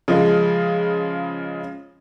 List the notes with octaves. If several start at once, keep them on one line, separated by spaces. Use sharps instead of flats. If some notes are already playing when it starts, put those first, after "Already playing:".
C#3 F3 G#3